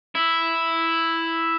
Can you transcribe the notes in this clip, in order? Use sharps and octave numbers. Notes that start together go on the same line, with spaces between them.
E4